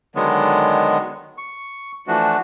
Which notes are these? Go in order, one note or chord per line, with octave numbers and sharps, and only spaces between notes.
D3 D#3 F#3 G#3 B3
C#6
E3 F3 A3 D4 F#4